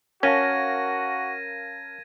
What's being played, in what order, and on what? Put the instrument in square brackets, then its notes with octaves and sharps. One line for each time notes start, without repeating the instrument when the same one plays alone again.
[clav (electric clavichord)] C#4 [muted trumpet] F#4 [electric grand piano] A#4 F5 A5 [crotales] G#6 A#6 D#7